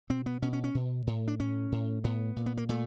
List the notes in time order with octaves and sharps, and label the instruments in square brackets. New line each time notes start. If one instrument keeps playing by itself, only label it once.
[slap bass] B2 C4
B3
B2 C#4
C#4
C#4
B2
A2
D4
A2 C#4
A2
A2 B3
A#2
B3
A#3
A#2 A3